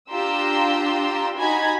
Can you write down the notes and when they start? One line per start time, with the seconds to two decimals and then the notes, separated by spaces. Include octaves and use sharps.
0.11 D4 F4 G4 A#5 C6 E6
1.38 D#4 F#4 G#5 A#5 B5 G#6